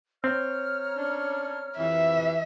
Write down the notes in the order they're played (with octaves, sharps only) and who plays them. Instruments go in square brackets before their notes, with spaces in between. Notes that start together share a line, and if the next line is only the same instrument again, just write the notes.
[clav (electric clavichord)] C4 [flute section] C#5 A#5 F6
[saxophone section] C#4 D4
[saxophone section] F2 C3 E3 [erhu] E5